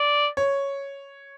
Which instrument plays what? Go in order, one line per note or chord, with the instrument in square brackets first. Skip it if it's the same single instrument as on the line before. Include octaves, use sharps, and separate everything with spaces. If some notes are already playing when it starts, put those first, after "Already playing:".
Already playing: [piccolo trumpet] D5
[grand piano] C#5